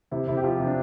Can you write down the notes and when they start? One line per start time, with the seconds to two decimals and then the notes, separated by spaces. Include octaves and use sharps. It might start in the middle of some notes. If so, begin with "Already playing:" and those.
0.11 C3 E4
0.28 C3 E4
0.37 G4
0.44 F3 F4
0.60 C3
0.67 D4